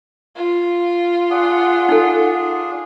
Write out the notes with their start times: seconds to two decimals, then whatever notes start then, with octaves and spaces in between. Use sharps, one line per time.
0.36 F4
1.30 D4 G#4 F#5
1.89 D#4 A4